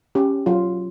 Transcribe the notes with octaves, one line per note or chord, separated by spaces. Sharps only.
C#4 G4
F#3 F4